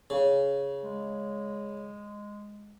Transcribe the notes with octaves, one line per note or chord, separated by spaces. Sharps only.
C#3
G#3